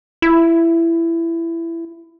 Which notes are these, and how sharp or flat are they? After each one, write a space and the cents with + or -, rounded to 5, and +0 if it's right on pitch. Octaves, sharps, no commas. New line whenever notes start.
E4 +15